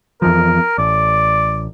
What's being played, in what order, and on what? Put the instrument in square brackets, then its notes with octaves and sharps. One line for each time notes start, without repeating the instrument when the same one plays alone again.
[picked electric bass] F2 E3 F3 [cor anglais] A#4
[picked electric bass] A1 [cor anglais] D5